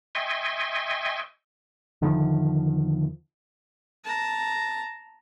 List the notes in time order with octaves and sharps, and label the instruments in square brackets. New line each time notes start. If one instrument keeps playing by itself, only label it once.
[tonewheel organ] D#5 E5 G5 G#5 C6 C#6
[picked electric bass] E2 D3 D#3 F3
[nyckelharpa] A5 A#5